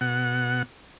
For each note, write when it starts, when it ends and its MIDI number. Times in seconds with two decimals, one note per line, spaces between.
0.01 0.63 47
0.01 0.63 78